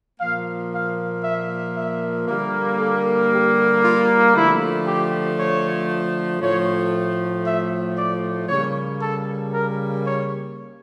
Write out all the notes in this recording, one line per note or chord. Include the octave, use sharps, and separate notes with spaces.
A#2 F3 A#3 F5
F5
E5
E5
D3 G3 A#3
A4
G4
F4
D3 F3 A3 E4
G4
C#5
A2 F3 A3 C#5
E5
D5
C#3 G3 A#3 C#5
A4
A#4
C#5